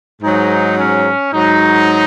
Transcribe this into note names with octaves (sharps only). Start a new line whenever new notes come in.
G#2 F#3 D#4
C#4
G#2 F#3 D#4